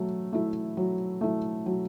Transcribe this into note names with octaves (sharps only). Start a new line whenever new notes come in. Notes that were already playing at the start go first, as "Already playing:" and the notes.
Already playing: F#3 A3
A3 E4
F#3
A3 E4
F#3